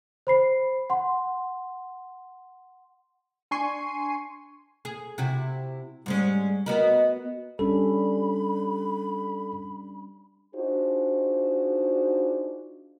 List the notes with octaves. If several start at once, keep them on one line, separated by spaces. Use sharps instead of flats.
C5 B5 C7
F#5 C6
D4 G#5 C6 C#6 C7 D#7
G#4
C3 E4 F#4
G#2 G3 G#3 C#4
B3 F#4 A#4 D#5
G3 C#4 D4 A4 B5
D4 D#4 F4 F#4 G#4 C5